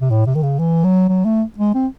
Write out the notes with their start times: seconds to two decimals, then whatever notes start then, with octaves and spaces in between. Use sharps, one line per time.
0.01 C3
0.10 A2
0.26 C3
0.35 D#3
0.43 C#3
0.59 E3
0.84 F#3
1.09 F#3
1.25 A3
1.58 G#3
1.74 C4